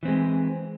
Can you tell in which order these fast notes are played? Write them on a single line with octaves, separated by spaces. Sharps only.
E3 C4 G#3